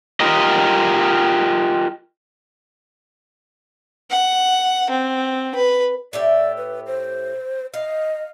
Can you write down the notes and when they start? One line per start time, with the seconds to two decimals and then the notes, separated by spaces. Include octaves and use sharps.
0.20 F4 G4 A#4 D#5
4.10 F#5
4.90 C4
5.55 B4
6.13 A2 G4 D5 E5
6.57 B4
6.87 C5
7.74 D#5 F5